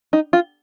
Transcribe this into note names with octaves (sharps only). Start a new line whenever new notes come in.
D#4
F4